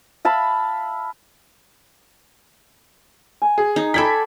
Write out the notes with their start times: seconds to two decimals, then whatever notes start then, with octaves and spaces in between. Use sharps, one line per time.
0.25 E5 F5 A5 B5
3.42 G#5
3.58 G#4
3.76 D#4
3.94 A4 D5 G5 B5 G#6 B6